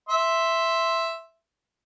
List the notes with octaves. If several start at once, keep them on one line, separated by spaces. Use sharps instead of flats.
E5 C6